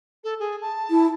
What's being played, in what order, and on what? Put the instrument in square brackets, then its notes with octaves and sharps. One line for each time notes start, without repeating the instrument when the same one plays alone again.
[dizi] A4
G#4
A5
[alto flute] E4